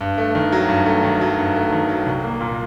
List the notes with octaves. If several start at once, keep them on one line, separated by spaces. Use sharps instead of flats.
G2
A3
D#3
F#3
G2
A3
D#3
F#3
G2
A3
D#3
F#3
C2
A#3
A#2